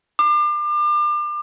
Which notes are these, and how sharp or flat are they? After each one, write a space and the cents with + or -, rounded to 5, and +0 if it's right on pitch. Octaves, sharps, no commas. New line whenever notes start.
D6 +35